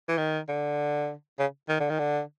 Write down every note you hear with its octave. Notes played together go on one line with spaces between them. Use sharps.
E3
D#3
D3
C#3
D#3
D3
D#3
D3